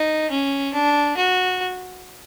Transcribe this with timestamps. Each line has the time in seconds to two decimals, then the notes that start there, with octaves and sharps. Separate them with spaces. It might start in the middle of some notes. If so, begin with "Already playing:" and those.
Already playing: D#4
0.30 C#4
0.73 D4
1.17 F#4